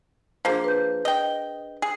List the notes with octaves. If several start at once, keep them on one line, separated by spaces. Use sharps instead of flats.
F3 A#3 D4 G#4 C5
B4 G6
D#5 G5
G#4